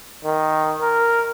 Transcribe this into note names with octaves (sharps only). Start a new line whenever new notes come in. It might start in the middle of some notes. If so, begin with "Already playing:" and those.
D#3
A#4